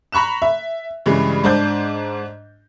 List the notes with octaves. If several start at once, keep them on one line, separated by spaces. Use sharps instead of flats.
A#5 B5 C#6 F#6 E7
E5
G2 C#3 E3 G#3
G#2 D4 C5 D6 G6